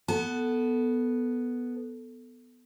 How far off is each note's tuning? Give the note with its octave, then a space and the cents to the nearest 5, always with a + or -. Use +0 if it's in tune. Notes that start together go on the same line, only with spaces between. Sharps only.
B3 +0 A4 +0 A5 -45